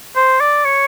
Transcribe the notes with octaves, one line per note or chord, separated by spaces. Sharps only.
C5
D5
C#5